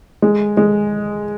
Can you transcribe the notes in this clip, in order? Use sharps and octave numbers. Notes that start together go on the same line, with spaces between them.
G#3
G#3